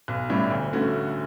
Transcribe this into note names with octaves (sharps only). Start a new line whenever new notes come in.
B1
A2 G3 C#4 E4
D2
D3 A3 C#4 F#4